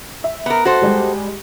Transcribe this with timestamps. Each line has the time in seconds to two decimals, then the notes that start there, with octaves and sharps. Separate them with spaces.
0.24 E5
0.46 B3 A#4
0.65 F#4 A4 C5
0.82 G3 G#3 G4